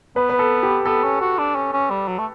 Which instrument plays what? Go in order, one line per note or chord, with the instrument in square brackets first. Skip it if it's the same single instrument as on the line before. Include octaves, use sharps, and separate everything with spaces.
[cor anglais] B3 [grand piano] B4
[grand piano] B4
A4
G4
[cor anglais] B3 [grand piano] A4
[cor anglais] C#4
F#4
D4
C#4
C#4
G3
F#3
A3